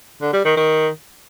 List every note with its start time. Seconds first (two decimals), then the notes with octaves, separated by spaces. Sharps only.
0.21 D3
0.33 G3
0.45 D#3
0.56 D#3